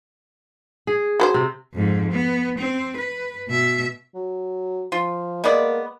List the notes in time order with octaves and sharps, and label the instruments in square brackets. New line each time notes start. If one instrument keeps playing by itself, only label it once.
[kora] G#4
[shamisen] F#3 B4 C5
[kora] C3 C4
[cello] F2 G#2
B3
C4
B4
B2 E5
[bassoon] F#3
[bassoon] F3 [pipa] F4
[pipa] G#3 B3 D5 [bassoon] A#3